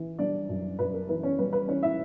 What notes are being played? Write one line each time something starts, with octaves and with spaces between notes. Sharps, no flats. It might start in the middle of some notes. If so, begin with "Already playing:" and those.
Already playing: E3
G3 D4 D5
F#2
F#2 B4
A#4
E3 B4
C#4 C#5
G3 B4
B4
E3 C#4 C#5
E4 E5